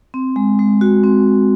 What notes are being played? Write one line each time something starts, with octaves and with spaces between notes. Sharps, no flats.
C4
G#3
G#3
F#4
C4